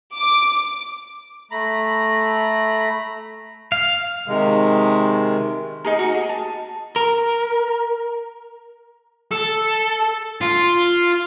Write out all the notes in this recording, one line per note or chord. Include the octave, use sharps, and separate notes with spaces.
D6
A3 A#5 B5
F5
C3 D#3 G#3
D#4 G#4 A#4
F#4 A#4
G#4
A5
A#4
A4
F4